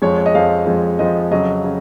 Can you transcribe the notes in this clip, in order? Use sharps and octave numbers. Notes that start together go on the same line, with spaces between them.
F2 F3 G#3 C#5
C#5
D#5
F2 F3 G#3 F5
F2 F3 G#3
F2 F3 G#3 D#5
F2 C#3 F#3 D#5
C#3